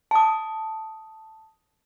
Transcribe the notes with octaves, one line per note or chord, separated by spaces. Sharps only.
A5 D#6